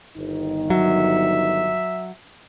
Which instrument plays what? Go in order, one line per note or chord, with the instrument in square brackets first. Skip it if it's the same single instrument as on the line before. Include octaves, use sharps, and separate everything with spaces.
[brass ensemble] G1 D#3 D#4
[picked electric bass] F#3 [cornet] E5